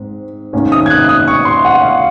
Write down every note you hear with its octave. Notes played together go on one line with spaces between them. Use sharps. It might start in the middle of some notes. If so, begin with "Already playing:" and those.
Already playing: G#2 C4
G#2 D#3 A#3 C#4
D#6
G#6
F#6
D#6
C#6
C6
F#5
F5